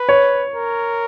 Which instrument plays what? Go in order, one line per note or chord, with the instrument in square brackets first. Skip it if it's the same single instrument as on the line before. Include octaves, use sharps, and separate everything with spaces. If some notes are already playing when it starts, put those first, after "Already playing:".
Already playing: [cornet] B4
[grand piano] C#5
[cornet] A#4